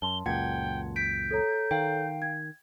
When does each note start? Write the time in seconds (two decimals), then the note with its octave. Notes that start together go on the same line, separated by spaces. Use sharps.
0.02 F#2 A5 C6 G7
0.26 C#2 F#2 A#2 F#5 G5 G#6
0.96 G6 B6 D7
1.31 A4 C#5 A#5
1.71 D#3 F5 G5
2.22 G#6